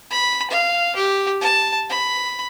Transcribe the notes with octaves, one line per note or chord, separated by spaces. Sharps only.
B5
F5
G4
A5
B5